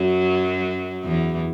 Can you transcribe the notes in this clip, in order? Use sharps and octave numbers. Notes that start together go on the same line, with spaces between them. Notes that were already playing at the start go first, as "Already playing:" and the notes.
Already playing: F#2 F#3
E2 E3